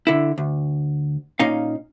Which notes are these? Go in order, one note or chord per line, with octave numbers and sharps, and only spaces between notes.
D3 E4
D2
A#2 C#4 D#4 F5